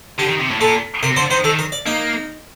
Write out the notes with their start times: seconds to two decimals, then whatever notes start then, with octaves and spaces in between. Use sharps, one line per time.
0.19 D3 G4
0.29 D#3
0.40 C3
0.51 A2
0.61 A#2 A4
1.03 C3 A#4
1.16 D3 C5
1.31 D#3 C5
1.44 D#3 A4
1.59 A#4
1.72 D5
1.86 A#3 D#4